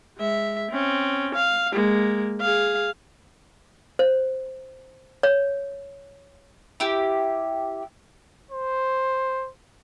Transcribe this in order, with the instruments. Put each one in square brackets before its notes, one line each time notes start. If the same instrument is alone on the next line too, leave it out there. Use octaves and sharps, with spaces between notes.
[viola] G#3 E5
C4 C#4
F5
G#3 A#3
G#4 F5
[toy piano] C5
C#5
[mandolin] E4 G4
[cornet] C5